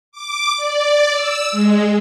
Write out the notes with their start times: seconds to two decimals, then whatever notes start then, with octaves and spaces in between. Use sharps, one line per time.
0.12 D6
0.57 D5
1.13 E6
1.52 G#3